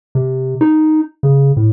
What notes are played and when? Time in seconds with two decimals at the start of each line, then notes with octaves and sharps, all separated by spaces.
0.15 C3
0.61 D#4
1.23 C#3
1.57 A2